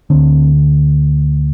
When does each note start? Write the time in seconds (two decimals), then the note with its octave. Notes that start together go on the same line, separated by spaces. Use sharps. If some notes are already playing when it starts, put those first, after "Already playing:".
0.10 D2 D3 C4